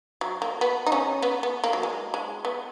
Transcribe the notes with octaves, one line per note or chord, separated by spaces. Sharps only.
F#3
A#3
B3
D#4
C#3 C#4
B3
B3
A#3
F#3
G#3
G#3
B3